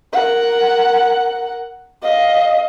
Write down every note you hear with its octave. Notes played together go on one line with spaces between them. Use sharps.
A#4 F#5
D#5 F5